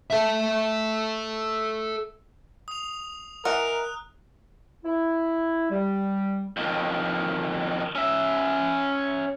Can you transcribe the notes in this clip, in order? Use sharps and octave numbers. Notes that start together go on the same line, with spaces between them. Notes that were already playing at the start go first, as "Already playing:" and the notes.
A4 E5
D#6 F7
E3 A#4 D#5 F#5 A#5 F6 F#6
E4
G3
F2 D#3
C#4 E5